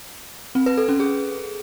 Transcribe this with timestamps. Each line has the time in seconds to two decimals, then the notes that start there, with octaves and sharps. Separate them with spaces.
0.55 C4
0.66 B4
0.77 A4
0.89 C#4
1.00 G#4